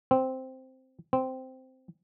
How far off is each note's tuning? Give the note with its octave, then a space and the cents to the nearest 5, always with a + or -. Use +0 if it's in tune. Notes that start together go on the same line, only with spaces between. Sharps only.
C4 -5
C4 -10